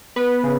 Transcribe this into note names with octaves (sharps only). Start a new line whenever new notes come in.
B3 B4
C#3